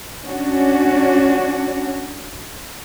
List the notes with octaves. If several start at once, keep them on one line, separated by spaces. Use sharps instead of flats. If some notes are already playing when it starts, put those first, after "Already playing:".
C#4 D4 F#4